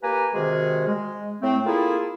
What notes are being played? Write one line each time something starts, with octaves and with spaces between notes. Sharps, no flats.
A#3 G4 B4 G#5 A#5
C3 D#3 G#3 F#4 G#4
G#3
A2 A3 C4
A#3 E4 F4 G#4 A4